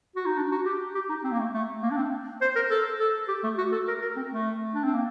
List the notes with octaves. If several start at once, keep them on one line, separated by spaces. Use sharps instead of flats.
F#4
D#4
D4
F#4
G4
G4
D#4
C4
A#3
A3
A3
A#3
D4
C4
C5
A#4
A4
A4
G4
A3
F#4
A4
A#4
A#4
C4
A3
D4
C4
A#3